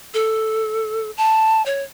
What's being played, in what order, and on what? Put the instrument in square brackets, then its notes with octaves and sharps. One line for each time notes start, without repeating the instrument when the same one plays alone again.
[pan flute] A4
A5
C#5